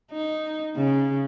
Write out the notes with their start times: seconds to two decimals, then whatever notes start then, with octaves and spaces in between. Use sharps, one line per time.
0.12 D#4
0.76 C#3